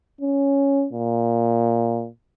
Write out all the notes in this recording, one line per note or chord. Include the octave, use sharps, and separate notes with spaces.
C#4
A#2